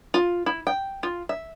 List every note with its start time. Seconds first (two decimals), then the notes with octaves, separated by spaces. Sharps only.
0.14 F4
0.46 E4
0.67 G5
1.03 F4
1.29 E5